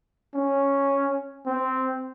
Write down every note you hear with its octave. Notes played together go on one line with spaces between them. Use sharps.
C#4
C4